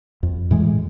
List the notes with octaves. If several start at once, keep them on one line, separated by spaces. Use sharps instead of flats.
F2
A2 E3 G#3